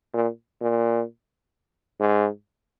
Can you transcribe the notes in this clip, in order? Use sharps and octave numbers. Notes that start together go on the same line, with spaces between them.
A#2
A#2
G#2